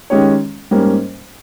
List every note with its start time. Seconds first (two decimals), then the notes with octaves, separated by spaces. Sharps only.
0.10 D#3 G#3 C#4 G4 C#5
0.71 G#2 G3 A#3 C#4